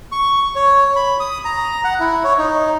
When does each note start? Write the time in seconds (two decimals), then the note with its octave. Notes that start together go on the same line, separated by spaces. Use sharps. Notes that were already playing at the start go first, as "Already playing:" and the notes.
0.12 C#6
0.56 C#5
0.96 B5
1.20 D#6
1.45 A#5
1.84 F#5
2.00 E4
2.24 C#5
2.38 D#4